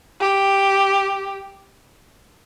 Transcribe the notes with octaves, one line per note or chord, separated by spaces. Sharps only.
G4